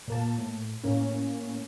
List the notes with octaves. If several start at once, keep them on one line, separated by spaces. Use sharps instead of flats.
A#2 A#3 A5
A2
A2 A#3 C#4